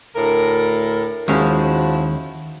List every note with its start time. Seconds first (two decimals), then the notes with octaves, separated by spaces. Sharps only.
0.15 D2 A2 A#4
1.28 D#2 F3 G#3 C#4 E4 F#4